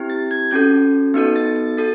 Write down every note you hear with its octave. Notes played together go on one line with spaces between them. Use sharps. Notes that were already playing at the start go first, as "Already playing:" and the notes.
Already playing: C4 E4 G4
A6
G#6
C#4 F#4 A4 G6
B3 D#4 F#4 A4
A6
A6
F#4 A4 A6